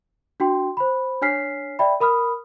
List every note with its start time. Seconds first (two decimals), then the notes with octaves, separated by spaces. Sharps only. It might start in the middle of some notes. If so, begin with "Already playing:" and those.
0.40 D4 F#4 G5 C6
0.77 C5 B5
1.22 D4 C#5 G#5 F6 B6 C7
1.79 D5 E5 G5 B5
2.00 A#4 B5 D#6 F6